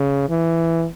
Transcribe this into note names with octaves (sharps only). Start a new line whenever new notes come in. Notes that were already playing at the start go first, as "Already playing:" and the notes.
Already playing: C#3
E3